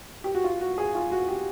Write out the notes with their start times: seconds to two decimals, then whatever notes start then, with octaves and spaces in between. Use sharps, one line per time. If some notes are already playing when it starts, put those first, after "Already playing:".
0.24 G4
0.35 F#4
0.44 F4
0.61 F#4
0.78 G#4
0.95 F4
1.12 F#4
1.28 G4